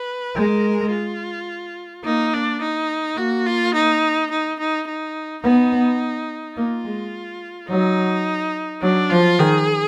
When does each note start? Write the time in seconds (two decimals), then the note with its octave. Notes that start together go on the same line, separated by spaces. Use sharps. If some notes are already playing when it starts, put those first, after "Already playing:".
Already playing: B4
0.35 G#3 A#4
0.91 F4
2.04 A#3 D#4
2.33 D4
2.61 D#4
3.17 A#3 F#4
3.46 F4
3.74 D#4
4.31 D#4
4.60 D#4
4.88 D#4
5.44 B3 D#4
6.57 A#3 F4
6.85 G#3
7.69 F#3 D#4
8.82 F#3 D4
9.10 F3 F4
9.39 D#3 G#4